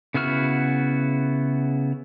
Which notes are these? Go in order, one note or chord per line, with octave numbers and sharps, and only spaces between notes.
C#3 B3 E4 F#4 F6